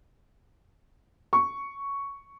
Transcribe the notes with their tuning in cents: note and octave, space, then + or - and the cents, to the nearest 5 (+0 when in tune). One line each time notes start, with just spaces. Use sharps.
C#6 +5